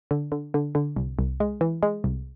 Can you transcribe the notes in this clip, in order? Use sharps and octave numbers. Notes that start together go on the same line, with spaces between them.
D3
D3
D3
D3
C2
C2
G#3
E3
G#3
C2